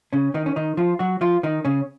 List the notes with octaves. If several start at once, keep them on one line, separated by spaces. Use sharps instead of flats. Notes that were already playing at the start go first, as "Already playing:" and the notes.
C#3 C#4
D#3 D#4
C#4
D#3 D#4
F3 F4
F#3 F#4
F3 F4
D#3 D#4
C#3 C#4